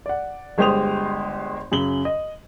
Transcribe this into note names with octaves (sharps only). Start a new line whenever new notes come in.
D5 F#5
G1 G#3 G4 C5 D#6 F7
F#2 C#3 F#7 G7
D#5